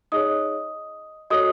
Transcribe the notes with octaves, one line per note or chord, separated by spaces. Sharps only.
D#4 G#4 C#5 D#5 D#6
F#4 A4 C#5 D#5 D#6